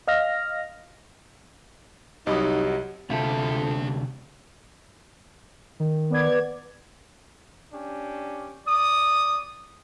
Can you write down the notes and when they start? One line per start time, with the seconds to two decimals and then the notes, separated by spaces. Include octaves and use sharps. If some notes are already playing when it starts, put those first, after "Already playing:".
0.08 D#5 F5 F6 A#6
2.27 C2 F#3 D#4 G4 D#5 B5 D#6
3.10 D2 C3 D4 F4 A4 E5
5.80 D#3
6.10 B3 D5 G#6
7.73 C#4 D4 G4
8.67 D5 D#6